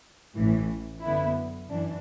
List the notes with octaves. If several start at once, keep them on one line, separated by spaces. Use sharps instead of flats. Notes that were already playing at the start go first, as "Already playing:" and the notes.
A1 A2 E3
F#2 D3 B3 E4
F#2 E3 D4